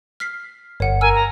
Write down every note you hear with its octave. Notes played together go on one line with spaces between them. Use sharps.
F6 B6 C7
G1 C#5 F#5
A#4 G#5 E6 F6
A#5